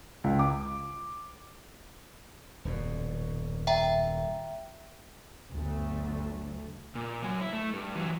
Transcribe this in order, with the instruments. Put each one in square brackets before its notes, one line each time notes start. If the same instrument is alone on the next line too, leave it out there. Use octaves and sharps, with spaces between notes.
[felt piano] C#2
D6
[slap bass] D#1 F#2 B2
[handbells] E5 G5 A#5
[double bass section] G1 D2 G2 D3 F#3 A3
[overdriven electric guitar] A#2
F#3 G#5
E4
A3
G2
E3 F#3